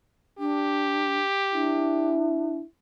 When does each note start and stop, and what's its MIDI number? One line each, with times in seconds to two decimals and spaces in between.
0.39 1.18 62
0.39 2.15 67
1.53 2.57 62
1.53 2.65 64